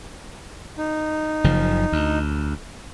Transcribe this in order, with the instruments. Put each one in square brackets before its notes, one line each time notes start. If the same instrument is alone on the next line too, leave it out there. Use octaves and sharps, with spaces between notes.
[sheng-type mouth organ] D#4
[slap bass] F#1 C#3 F3
D2